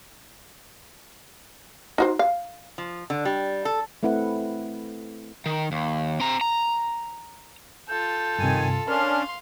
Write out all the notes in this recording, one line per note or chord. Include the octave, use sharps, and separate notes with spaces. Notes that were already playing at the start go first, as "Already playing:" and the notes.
D#4 F#4 C5
F5
F3
D3
G3
A4
A3 C4 E4 B4 F#5
D#3
D#2
C4 A#5
A#5
F4 A4 G6
G2 C3 D#3 G#5
C#4 D4 A#4 F5 C6 F6